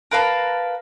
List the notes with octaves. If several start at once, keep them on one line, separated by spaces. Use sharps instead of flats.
A#4 B4 F5 A5